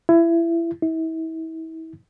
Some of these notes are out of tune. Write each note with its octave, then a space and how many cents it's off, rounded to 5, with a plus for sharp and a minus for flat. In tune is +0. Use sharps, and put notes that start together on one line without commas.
E4 +25
E4 -35